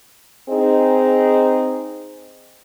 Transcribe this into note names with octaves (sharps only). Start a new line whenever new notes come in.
C4 D#4 G#4 D#5